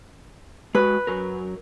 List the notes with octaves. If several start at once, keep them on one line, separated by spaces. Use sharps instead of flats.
G#3 F#4 B4
F#2 F#3 A#4